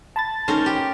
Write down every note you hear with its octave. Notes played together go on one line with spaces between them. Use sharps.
A5 B5 A6
C#4 D#4 A4 A#4 C5
G4